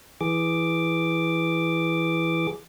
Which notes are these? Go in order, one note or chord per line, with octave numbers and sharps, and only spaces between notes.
E3 G#4 D6